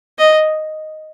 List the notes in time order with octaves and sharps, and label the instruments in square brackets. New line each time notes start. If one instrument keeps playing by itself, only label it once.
[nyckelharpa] D#5